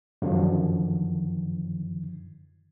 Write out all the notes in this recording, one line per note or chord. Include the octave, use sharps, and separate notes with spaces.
F#2 D3 D#3 F3